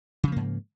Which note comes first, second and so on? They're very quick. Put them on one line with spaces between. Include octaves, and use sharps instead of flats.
C#3 F3 A#3 G#2